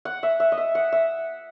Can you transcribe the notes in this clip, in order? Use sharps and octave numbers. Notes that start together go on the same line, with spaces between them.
F#5
E5
E5
D#5
E5
F#5
E5